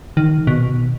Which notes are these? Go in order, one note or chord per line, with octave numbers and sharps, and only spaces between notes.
D#3
B2